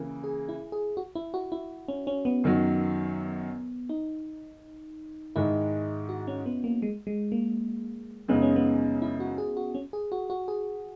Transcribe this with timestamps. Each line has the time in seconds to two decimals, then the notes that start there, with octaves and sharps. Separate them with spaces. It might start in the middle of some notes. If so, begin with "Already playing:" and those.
Already playing: C#3 E3 A#3
0.24 G#4
0.49 E4
0.72 G#4
0.97 F#4
1.15 E4
1.34 F#4
1.52 E4
1.88 C#4
2.07 C#4
2.25 B3
2.44 F#2 D#3 F#3
3.89 D#4
5.36 G#2 D#3 G#3 E4
6.09 F#4
6.28 C#4
6.46 B3
6.64 A#3
6.82 G#3
7.07 G#3
7.32 A#3
8.28 F#2 C#3 G#3 B3 D#4
8.42 C#4
8.56 B3
9.02 E4
9.20 F#4
9.38 G#4
9.57 F#4
9.75 C#4
9.93 G#4
10.12 F#4
10.30 F#4
10.48 G#4